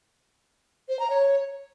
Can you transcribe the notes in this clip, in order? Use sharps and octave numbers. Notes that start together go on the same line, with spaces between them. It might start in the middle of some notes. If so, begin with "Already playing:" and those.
C5
A#5
C#5